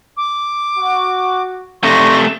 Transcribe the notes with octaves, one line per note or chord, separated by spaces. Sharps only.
D6
F#4
C3 A3 D5 C6 C#6 A#6